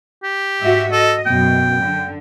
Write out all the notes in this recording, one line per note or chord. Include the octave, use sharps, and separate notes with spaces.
G4
G#2 F#4 E5
A4 D#5
F#2 B2 G5
D3